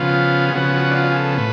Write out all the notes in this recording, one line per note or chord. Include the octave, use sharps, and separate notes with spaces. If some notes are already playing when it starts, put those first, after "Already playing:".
Already playing: C#3 F3 B3 F4
G#4
C#3 F3 B3 F#4
F#4
D4
F4
G#4
A4
A2 B4